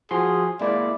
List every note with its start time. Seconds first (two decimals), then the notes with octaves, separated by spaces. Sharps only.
0.11 F3 F#4 G#4 C6
0.61 G#3 A#3 E4 D5